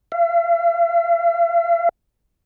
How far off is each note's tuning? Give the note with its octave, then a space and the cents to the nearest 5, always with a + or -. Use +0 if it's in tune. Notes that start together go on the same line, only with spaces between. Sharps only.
F5 -45